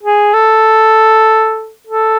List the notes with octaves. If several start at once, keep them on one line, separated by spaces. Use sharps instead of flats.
G#4
A4
A4